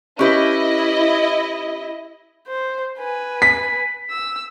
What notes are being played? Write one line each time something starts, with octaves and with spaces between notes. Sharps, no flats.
C#4 E4 G4 B4 D#5
C5
B4 G#5
B6
E6